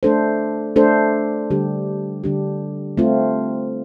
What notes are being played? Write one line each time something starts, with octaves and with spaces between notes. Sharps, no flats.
A3 D4 A4 C5
A3 D4 A4 C5
D3 G3 D4 G4
D3 G3 D4 G4
A3 C4 F4